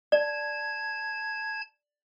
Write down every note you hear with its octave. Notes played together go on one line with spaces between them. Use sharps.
D5 A5 G#6